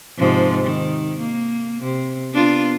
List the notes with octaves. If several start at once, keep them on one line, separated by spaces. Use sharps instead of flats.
G#2 C3 F3
D#3
A#3
C3
B3 D4 F4